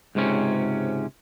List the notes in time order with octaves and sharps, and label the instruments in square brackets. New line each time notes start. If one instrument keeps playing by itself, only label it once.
[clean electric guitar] C#2 G#2 C3 C#4